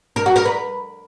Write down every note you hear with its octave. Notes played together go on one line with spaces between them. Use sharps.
A#4
F#4
A#4
B4